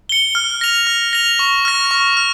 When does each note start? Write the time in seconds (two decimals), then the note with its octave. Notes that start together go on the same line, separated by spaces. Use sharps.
0.09 C#7 G7
0.35 F6
0.61 A#6 F7
0.87 F6
1.13 A#6 F7
1.39 C#6
1.65 F6 A#6
1.91 C#6
2.17 F6